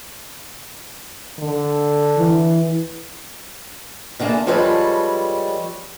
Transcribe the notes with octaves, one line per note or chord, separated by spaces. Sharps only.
D3
E3
E2 D3 A#3 G#4 E5 A5
F3 G3 G#3 A4 B4 C#5